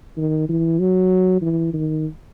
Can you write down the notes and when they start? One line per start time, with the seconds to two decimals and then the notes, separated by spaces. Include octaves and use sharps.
0.17 D#3
0.49 E3
0.79 F#3
1.41 E3
1.73 D#3